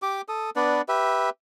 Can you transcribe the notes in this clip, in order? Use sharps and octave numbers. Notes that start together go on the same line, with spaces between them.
G4 D6
A4 D#6
B3 D4 B4 D5
G4 B4 E5